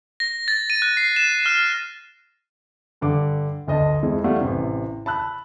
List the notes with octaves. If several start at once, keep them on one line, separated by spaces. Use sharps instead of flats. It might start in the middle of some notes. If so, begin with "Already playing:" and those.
A#6
A6
D#7
F#6
C7
E7
F6
G2 D3 D6
G1 D2 D#5 A5
F2 G#3 E4
G3 A3 E4 D5 F5 F#5
A1 C3
A5 B5 E6 F#6